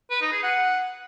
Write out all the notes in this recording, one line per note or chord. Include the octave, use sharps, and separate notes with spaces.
B4
D#4
G#4
F#5